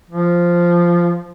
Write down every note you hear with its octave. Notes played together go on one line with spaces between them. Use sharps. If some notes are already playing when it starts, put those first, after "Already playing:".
F3